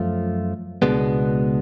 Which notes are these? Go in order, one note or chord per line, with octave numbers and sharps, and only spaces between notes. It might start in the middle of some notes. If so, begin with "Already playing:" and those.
Already playing: F#2 F3 A3 F4
C#2 B2 G#3 B3 D4